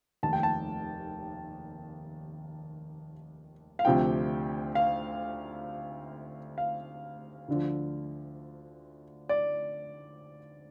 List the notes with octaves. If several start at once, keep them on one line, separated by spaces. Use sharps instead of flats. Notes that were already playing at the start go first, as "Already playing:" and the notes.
F1 D#2 D#3 A5
G5
A5
F5
D2 C3 F3 G5
F5
F5
D2 D3 F3
D5